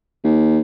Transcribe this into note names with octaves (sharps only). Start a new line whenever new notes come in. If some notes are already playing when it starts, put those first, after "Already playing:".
D#2